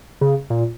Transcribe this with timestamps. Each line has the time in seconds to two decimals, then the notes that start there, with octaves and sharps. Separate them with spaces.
0.21 C#3
0.50 A#2